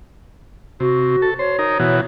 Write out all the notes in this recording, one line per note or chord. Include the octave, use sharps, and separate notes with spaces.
C3 F#4
A4
C5 C#5
D#4 A#4
B2 E3 F#4